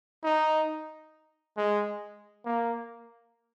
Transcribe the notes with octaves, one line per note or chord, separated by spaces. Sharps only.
D#4
G#3
A#3